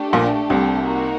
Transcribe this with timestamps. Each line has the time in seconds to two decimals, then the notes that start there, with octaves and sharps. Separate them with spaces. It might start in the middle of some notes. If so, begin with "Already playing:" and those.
Already playing: A3 D4 G4
0.13 A#1 A#2
0.50 C2 C3
0.87 A#3 D#4 F#4 A#4